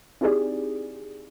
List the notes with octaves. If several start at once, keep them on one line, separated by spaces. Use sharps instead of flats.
C4 D#4 E4 G4 G#4 D5